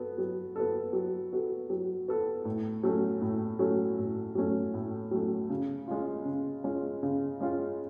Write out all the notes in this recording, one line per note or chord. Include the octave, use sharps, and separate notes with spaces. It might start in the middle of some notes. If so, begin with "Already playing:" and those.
Already playing: B3 F#4 A4
F#3
B3 F#4 A4
F#3
B3 F#4 A4
F#3
B3 F#4 A4
A2
F#3 A3 C#4
A2
F#3 A3 C#4
A2
F#3 A3 C#4
A2
F#3 A3 C#4
C#3
G#3 C#4 F4
C#3
G#3 C#4 F4
C#3
G#3 C#4 F4